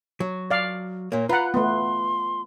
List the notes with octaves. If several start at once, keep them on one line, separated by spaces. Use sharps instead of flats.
F#3
D5 F5
A#2 A#3 C#5
F4 B4 F#5 A#5
A3 B3 C6